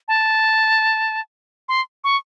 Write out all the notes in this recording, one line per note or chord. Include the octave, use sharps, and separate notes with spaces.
A5
C6
C#6